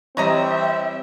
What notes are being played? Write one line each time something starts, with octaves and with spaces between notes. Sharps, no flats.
E3 G3 C4 C#5 D#5 E5 A#5